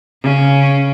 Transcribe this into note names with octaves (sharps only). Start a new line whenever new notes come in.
C#3 C#4